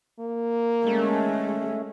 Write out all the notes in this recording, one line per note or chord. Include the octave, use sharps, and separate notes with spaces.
A#3
G#3 A3 C#4